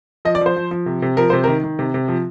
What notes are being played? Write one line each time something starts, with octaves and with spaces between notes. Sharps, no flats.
F3 D#5
D5
F3 C5
F3
F3
C3
C3
F3 A#4
C3 C5
D#3 A#4
D#3
C3
C3
F3